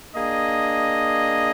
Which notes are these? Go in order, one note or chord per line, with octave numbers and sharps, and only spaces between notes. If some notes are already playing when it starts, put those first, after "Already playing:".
A#3 D4 G#4 D#5